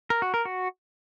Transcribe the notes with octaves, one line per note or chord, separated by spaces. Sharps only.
A#4
F#4
A#4
F#4